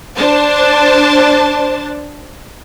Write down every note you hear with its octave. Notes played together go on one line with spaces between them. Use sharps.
D4 C5 A5